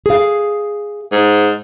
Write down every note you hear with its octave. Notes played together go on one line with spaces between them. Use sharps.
G#4 F5
G#2